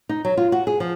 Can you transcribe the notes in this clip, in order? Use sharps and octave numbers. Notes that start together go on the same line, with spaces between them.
D#4
F#3
F4
F#4
G#4
F3